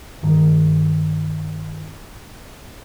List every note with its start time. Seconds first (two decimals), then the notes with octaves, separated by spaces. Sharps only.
0.23 G2 D#3